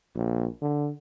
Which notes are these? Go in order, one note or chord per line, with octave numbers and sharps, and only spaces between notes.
A#1
D3